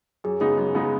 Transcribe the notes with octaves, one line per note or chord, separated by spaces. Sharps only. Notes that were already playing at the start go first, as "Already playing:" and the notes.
F#2 G#4
C#3 G#3 B3 D#4 G#4
F#2
C#3 G#3 B3 D#4